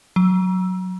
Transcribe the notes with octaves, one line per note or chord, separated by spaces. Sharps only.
F#3